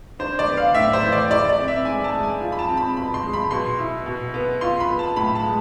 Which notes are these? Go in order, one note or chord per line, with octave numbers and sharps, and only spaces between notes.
D4 C5
D5
B3
F5
A2 E5
C5
E3
D5
E4 D5
D5
C4
E5
G#2 G#5
A5
G#3
G#5
F4
B5
A5
C4
B5
B2 B5
C6
G#3
B5
B2 C6
E4
B2
B3
F4 C6
B5
B3
A5
A2 B5
A5
G#3